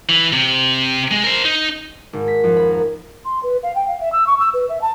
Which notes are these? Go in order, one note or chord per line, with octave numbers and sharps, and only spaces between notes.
E3
C3
G#3
A#4 C5
D#4
G#1
B6
F2
B5
A#4
C6
B4
F5
G5
F5
E5
E6
C#6
E6
B4
E5
A5